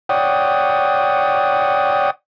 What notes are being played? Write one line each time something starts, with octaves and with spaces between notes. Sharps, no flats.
C#5 D5 F#5 G5 D#6